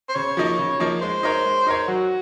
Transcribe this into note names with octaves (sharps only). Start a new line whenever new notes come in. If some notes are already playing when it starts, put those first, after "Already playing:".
C5
C#3 C#5
F3 A#3 D#4
C#3
F3 A#3 D#4
G#3 C5
D#4 A#4 C#5
G#3
D#4 A#4 C#5
F#3 F#4